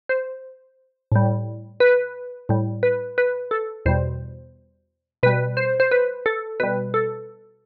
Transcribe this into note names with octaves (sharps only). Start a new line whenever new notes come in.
C5
A2 G3
B4
A2 G3
B4
B4
A4
E2 B2 G3 C5
B2 G3 B4
C5
C5
B4
A4
B2 G3 B4
A4